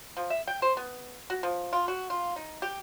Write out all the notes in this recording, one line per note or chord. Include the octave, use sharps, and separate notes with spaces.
F3
E5
G5
C5
B3
F#4
F3
F4
F#4
F4
D#4
G4